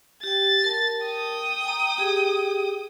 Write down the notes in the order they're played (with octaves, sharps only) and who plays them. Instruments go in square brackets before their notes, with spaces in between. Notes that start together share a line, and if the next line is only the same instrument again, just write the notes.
[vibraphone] G4 G5 [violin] A6
[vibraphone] A#4 A5
[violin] G5 D#6
[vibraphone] G#5 A#5
G4 G#4